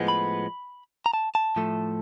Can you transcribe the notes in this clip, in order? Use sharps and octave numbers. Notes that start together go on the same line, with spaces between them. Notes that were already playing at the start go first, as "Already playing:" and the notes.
Already playing: A2 F3 G#3 B3
B5
A#5
A5
A5
A2 F3 A3